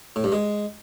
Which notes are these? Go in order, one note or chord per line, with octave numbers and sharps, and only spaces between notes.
A2
G2
G#3